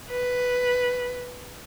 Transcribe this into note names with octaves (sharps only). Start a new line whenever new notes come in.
B4